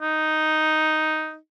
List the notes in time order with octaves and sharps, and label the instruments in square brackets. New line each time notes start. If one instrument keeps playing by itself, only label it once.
[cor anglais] D#4